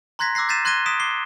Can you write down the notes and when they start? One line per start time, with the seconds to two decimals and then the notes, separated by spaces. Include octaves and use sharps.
0.19 A#5 C6 F#6 G#6 A#6 B6
0.35 D6 E6 F#6 A#6 C7
0.49 G6 A6 B6 C7 D#7 E7
0.65 C6 F#6 G#6 A#6 D#7 G7
0.86 D#6 B6 D7 E7
1.00 D6 C7 G7